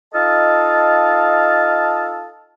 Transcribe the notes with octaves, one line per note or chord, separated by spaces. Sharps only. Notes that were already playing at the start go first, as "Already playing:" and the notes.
D#4 F4 A4 D#5 F5 A5